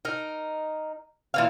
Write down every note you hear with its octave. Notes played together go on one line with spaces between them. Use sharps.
D#4 A#4
A#2 E3 F5